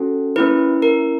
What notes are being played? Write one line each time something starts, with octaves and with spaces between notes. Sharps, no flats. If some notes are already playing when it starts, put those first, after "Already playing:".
Already playing: C#4 F#4 A4
A#3 C#4 E4 B4
A#4